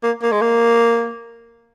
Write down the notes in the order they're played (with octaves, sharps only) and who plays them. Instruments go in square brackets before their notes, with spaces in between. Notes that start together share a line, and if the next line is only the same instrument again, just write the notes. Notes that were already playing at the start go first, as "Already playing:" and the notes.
[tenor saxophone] A#3
A#3
G#3
A#3